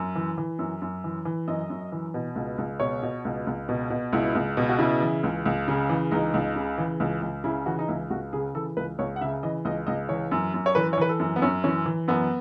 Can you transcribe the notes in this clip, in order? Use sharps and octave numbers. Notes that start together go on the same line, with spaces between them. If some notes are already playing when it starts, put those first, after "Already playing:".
Already playing: F#2
E3
E3
F#2
F#2
E3
E3
F#2 D#5
F#2
E3
B2
C#2
C#2
B2 C#5
B2
C#2
C#2
B2
B2
C#2 E4
C#2
B2
F#4
C#3 E4
E3
C#2
C#2
C#3
E3
C#2 D#4
C#2
C#3
E3
C#2
C#2
C#3 E4
E3 F#4
D#4
C#2 E4
C#2 F#4
C#3 G#4
E3 A4
C#2 B4
C#2 C#5
F#5
C#3 E5
E3 D#5
C#2 D#5
C#2 D#5
E3 C#5
F#2
F#2
C#5
E3 B4
C#5
E3 B4
A4
F#2
B3
F#2 C#4
E3 C#4
E3
F#2 B3